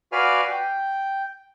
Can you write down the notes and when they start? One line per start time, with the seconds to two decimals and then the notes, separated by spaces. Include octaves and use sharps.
0.12 F#4 B4 D5 F5 G#5 F6
0.51 G5